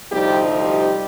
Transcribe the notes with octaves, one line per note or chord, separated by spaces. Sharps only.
D2 C3 F3 G3 C4 D#4 G4
G3 G4